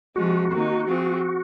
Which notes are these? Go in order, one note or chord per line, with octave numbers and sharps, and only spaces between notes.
C3 F3 G#3 F#4
D#3 A#3 D#4
F3 C4 F4 G#4